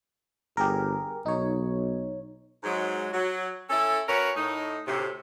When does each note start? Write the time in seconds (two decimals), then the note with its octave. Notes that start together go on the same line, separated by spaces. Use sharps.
0.57 G1 G4 G#4 A#4
1.26 B1 D#4 C#5
2.63 G#2 F#3 G#3
3.13 F#3
3.70 C#4 E4 A4
4.09 C#4 F#4 A#4 B4 C#5
4.37 A2 D#4
4.87 D2 A2 C3